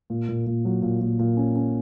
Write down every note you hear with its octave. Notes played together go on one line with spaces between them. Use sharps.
A#2
A#2
A#2
F#3
A#2
A#2
A#2
C#4
C#4